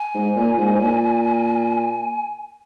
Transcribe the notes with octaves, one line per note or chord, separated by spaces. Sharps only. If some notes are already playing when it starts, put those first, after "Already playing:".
Already playing: G#5
G#2
A#2
G#2
G#2
A#2